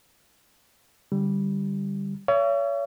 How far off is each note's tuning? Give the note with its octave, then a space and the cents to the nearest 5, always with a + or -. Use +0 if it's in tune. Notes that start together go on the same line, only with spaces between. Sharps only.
D3 +0 G3 +0
C#5 +30 E5 +45